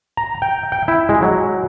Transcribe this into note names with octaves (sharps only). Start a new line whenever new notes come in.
A#5
G5
G5
E4
G#3
F#3